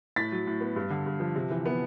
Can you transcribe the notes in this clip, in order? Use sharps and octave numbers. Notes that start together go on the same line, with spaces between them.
A2 A6 B6
F#3
A2
B3
G2
D3
G2
F3
C3
E3
B3